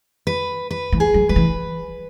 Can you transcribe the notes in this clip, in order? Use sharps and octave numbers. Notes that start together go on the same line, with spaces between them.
B4
B4
E3
G#4
F#3
F#3 B4
E3